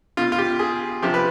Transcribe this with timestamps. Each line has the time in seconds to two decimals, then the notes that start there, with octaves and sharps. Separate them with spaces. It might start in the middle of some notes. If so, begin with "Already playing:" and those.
0.17 B2 F4
0.32 F4
0.38 G4
0.59 G#4
1.02 C3 F3 G4
1.14 B4